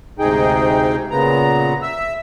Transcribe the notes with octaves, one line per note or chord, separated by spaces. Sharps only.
D2 G#2 C3 D#4 G#4 G5
A#2 C#3 B3 A#5
E5 E6